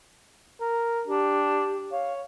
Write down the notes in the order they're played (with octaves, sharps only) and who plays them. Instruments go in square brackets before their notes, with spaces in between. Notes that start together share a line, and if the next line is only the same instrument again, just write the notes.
[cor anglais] A#4
[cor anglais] D4 [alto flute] G4
[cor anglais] C#5 [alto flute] F5